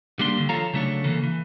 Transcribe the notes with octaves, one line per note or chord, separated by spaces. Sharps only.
G3 A#3 D4 C6
D3 D#3
F3 F4 A4 C#5 F5 A#5
C#3 F#3 A3 D4 F#4 C#5
C#3 E3 A#3 A4
E3